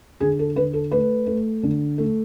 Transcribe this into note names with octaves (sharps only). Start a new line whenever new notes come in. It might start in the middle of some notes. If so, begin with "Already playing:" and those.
D3 G#4
A4
D3 B4
A4
A3 B4
A3
D3
A3